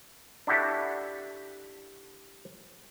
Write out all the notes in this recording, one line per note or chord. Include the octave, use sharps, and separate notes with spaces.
D4 E4 F#4 G4 A4 E5